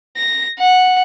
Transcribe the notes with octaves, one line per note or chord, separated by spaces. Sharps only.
A#6
F#5